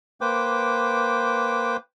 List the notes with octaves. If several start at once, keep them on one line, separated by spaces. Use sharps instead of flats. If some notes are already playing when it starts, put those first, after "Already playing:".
A#3 B4 C5 G5 D6